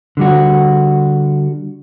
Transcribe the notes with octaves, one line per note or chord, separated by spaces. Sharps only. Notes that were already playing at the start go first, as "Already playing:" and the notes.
D3 G3 F#4